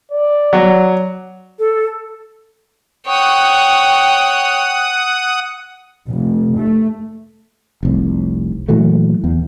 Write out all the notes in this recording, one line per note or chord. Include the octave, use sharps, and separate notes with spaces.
D5
F#3
A4
C#5 F#5 G5 D#6
F1
A3
F1 C2
A#2 E3 F#3 A3
E2